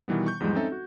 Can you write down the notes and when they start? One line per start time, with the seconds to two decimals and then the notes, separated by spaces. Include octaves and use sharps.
0.08 B2 D#3 E3 G3 B3
0.26 C#6 G6
0.40 E2 G#2 F3 G3 G#3
0.55 C4 C#4 D#4 A4 E5
0.72 F#4